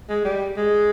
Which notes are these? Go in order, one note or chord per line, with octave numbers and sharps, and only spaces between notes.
G#3
G3
G#3